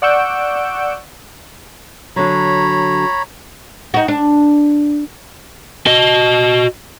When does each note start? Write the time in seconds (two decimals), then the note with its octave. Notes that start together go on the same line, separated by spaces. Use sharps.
0.02 D5 F#5 C#6 E6 G6 D7
2.16 D3 F#3 C#5 A#5 B5
3.94 D#4 F#4
4.08 D4
5.87 F#4 D#5